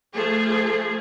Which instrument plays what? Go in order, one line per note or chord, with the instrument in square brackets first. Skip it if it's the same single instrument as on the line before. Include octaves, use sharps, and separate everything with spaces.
[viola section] F3 A3 G#4